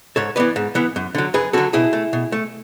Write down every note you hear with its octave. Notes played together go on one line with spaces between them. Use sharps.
G#2 A4 C#5
E3 B3 B4 D5
G#2
E3 B3
F#2
D3 F#3
F#2 G#4 B4
D3 F#3 F#4 A4
B2 E4 G#4
A3
B2
A3